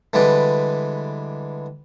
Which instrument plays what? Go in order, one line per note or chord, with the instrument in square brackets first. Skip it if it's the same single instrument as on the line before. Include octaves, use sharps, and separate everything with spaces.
[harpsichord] D3 E3 G3 G#3 B4 D5